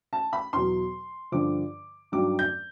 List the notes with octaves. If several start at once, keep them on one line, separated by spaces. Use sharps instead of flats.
A5
B5
E2 B2 F#3 C6
G2 D3 F3 D6
G2 D#3 F#3 D6
G6